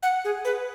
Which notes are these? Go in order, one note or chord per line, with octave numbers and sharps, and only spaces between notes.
F#5
G#4
B4